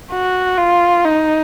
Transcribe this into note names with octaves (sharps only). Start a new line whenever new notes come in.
F#4
F4
D#4